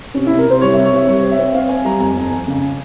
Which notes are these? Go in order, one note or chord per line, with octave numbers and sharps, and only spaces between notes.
C3 C#4
C3 E4
A#4
C3 C5
G3 C#5
C3 E5
C#5
C3 E5
G3 C#5
C4
E5
C4
E5
C4 F5
C4 G#5
G3 A#5
F2 G#5
F2
F2
C#3